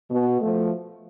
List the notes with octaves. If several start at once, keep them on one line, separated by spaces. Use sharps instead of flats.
B2
F3 A3